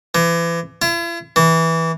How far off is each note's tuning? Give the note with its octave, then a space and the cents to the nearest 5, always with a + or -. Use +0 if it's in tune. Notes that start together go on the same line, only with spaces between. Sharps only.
E3 +35
E4 +45
E3 -10